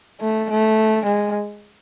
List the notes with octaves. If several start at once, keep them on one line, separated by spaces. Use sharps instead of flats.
A3
A3
G#3